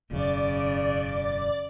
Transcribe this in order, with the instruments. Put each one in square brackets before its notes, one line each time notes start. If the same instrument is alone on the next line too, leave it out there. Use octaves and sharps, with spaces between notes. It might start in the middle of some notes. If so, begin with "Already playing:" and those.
[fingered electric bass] E1 F#2 [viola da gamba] C#3 [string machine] D5